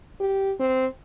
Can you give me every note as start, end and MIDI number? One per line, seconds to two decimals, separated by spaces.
0.20 0.54 67
0.60 0.87 60